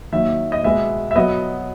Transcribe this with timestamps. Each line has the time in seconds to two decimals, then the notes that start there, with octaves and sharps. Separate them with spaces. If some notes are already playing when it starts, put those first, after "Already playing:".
0.12 D#3 F#3 A#3 E5
0.52 D#5
0.63 B2 G#3 B3 E5
1.11 E5
1.15 B2 F#3 B3 D#5